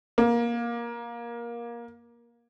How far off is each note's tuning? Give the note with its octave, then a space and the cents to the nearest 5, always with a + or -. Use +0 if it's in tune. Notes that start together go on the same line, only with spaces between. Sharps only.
A#3 +20